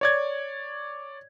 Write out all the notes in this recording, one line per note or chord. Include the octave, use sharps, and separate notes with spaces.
C#5 D5 G#6